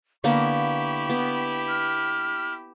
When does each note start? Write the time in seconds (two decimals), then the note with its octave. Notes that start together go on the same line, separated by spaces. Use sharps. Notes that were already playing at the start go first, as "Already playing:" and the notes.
0.24 D3 A#3 B3 E4 G4 C#6
1.10 B3
1.68 F6